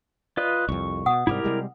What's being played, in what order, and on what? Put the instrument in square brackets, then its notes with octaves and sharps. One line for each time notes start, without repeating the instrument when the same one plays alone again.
[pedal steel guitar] F4 B4 D#5 [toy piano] D5
[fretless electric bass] C2 F2 [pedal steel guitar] C#6
[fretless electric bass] B2 [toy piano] F#5 D#6
[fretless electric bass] G#2 C3 G3 [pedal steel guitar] E4 G4 A#4
[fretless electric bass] C3 G3 G#3